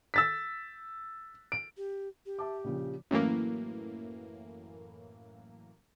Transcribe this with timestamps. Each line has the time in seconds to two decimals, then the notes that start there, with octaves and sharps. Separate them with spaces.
0.14 E6 A6 B6
1.52 D7
1.77 G4
2.26 G4
2.39 E5 A5 D6
2.64 A#1 C#3 F3
3.11 F#2 A2 E3 A#3